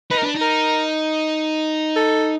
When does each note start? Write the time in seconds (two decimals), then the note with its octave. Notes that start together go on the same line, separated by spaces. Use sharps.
0.11 D#4 B4
0.18 A#4
0.23 D4 B4
0.35 D#4
0.41 A#4
1.96 A4